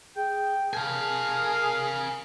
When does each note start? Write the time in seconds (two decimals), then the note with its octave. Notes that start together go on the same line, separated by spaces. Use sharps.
0.16 G#4 G5
0.73 G#4 A#4 F5 G#5 A5